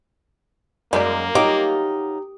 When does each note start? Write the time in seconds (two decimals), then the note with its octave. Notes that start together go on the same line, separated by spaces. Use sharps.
0.93 F#2 G#3 A#3 D#4 D5
1.35 F#3 D#4 F4 G4